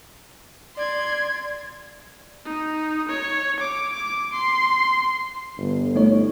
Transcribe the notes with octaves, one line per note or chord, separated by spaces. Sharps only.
D5 C6 G#6
D#4
C#5
D6
D6
C6
G1
A3 D#4 C#5